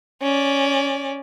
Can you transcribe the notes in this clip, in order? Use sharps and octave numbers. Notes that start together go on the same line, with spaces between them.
C#4 D5